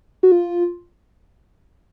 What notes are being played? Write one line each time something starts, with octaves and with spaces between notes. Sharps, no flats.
F#4
F4